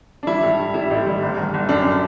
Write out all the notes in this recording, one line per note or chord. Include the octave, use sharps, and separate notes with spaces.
D4
G3 E4
G2
G2
G3 E4
A1
G3
G1
G1
G1
F#2 D4